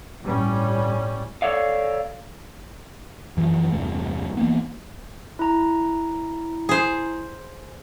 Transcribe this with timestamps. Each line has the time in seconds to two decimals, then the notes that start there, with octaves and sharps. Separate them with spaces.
0.25 G1 A2 G3 C#4
1.42 A4 C#5 D5 F5
3.37 F#2 E3 F3
3.72 E2 G2 C3 A3
4.37 E3 A#3 B3
5.39 E4 A#5
6.69 G#4 C5